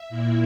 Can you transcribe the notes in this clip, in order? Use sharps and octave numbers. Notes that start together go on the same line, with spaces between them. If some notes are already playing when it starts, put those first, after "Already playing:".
Already playing: E5
A#2 A#3 E4